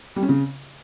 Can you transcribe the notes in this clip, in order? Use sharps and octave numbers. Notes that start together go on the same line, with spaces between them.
G3
C#4
C#3